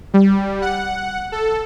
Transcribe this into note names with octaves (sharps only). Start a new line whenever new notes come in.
G3
F#5
A4